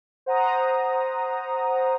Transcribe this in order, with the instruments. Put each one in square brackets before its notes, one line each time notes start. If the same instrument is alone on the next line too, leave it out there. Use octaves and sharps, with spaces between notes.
[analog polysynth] C5 F#5 A#5 D#6